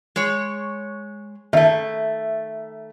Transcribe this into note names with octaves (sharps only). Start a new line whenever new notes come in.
G#3 C#5
D#3 A3 E5